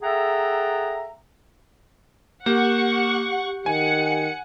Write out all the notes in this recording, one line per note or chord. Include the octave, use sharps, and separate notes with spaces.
G#4 A4 E5 F#5 G5 A#5
A#3 G4 F#5 C#6
D#3 F#5 G#5 C#7